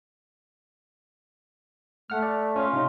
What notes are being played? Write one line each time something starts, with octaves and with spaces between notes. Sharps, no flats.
A3 F#5 F6
D5
C#4 F4
C3 D#4